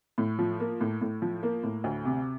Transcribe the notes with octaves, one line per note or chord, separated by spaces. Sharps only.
A2
F3
A#3
A2
A2
F3
A#3
A2
D2
C3